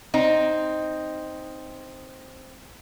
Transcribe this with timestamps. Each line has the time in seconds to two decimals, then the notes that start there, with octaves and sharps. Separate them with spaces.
0.14 C4 D#4